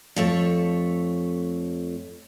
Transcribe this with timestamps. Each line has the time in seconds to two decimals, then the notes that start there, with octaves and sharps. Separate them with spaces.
0.16 F2 A3 C#5